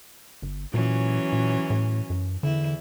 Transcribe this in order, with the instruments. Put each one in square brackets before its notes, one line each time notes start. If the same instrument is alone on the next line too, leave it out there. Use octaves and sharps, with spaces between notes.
[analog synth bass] G1
[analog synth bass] A#2 [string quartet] E3 F#3 C#4
[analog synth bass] A#2
A2
F#2
[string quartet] E2 E4 [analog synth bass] D3